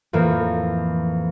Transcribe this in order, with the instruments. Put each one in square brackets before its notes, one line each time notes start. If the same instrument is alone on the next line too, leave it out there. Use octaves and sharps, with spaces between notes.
[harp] F2 A2 E3 A#3